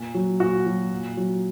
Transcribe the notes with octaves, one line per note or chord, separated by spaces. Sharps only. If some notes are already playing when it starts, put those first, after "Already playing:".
Already playing: A#2
F#3
A#2 F#4
F#3
A#2
F#3